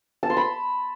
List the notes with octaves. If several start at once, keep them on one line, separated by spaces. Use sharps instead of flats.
A5
C6
B5